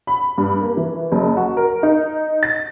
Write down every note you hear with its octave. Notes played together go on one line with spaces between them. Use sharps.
B5
G2
A#3
E3
F#1
F#4
A#4
D#4
A6